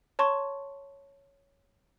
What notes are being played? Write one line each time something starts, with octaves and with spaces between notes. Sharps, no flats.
C#5 A5 C6 C#6